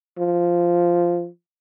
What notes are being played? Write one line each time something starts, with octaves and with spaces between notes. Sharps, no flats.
F3